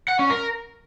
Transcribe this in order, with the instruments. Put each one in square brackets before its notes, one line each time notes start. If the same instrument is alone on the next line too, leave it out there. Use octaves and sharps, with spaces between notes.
[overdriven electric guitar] F#5
C#4
A#4